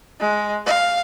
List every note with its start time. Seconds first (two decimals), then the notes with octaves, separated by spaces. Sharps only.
0.20 G#3
0.66 F5